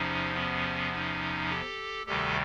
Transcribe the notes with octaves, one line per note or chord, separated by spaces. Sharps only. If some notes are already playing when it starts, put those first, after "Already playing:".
Already playing: E2 C3 F3 C#4 D#4
B3 C#4
C#4 D#4
G4 A4
D2 C3 D#3 G3 G4 A4